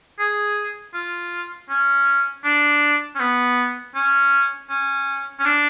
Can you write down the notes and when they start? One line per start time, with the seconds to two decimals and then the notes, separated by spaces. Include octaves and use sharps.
0.19 G#4
0.94 F4
1.69 C#4
2.44 D4
3.15 C#4
3.20 B3
3.95 C#4
4.70 C#4
5.39 C#4
5.45 D4